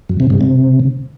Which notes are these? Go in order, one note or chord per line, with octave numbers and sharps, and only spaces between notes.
F#2
C3
G2
C3